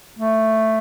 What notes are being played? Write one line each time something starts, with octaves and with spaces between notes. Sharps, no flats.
A3